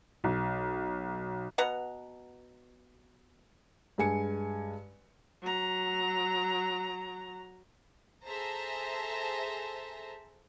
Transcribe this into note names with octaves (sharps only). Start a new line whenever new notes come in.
B1
B2 B4 F#5 A#5
G2 G#3 G#5 C#7
F#3 A#5
G#4 A4 C5 E5 A5 A#5